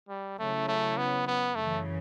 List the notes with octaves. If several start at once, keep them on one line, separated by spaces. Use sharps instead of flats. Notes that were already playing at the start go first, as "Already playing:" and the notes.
G3
C#3 F#3 A3 C#4 E4
A3
B3
B3
F#2 C#3 E3 A3